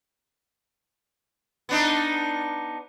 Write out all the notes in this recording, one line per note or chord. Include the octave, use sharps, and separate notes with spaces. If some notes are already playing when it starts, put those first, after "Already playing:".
B3 D4 D#4